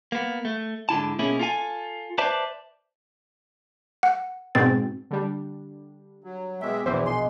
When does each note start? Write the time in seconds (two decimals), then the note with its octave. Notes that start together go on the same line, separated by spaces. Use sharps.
0.12 A#3 B3
0.45 A3
0.89 G#2 D3 E4 A5
1.19 B2 A#3 C#4 E4 G#4
1.39 F4 A4 G#5
2.18 B4 C5 D5 E5 A5
4.03 F#5
4.55 G#2 B2 C4 A6
5.11 D3 G3 D4
6.24 F#3
6.61 B2 G#3 E5 G5 G#5 D6
6.86 A#1 E2 B2 E3 C5 E5
7.06 A#3 D#4 G#4 C6